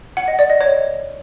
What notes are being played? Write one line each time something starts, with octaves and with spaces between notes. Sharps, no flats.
F#5
D#5
D5
D#5
C#5